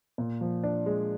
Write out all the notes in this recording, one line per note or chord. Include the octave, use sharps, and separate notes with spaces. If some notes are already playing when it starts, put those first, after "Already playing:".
A#2
F3
D4
G#3